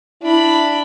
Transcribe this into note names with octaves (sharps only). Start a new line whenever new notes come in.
D4 E4 B5